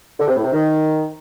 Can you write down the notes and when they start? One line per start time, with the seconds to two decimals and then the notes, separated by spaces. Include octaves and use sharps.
0.20 D3
0.28 C3
0.36 A2
0.44 C3
0.52 D#3